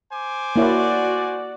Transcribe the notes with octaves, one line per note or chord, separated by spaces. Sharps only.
C5 G#5 D6
A#3 E4 F#4 C#5 D5